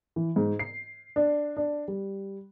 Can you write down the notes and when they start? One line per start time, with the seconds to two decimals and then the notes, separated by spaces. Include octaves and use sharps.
0.16 E3
0.36 G#2
0.59 C7
1.16 D4
1.57 D4
1.88 G3